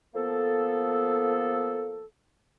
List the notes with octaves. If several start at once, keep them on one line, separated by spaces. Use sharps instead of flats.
F3 A#3 B3 A4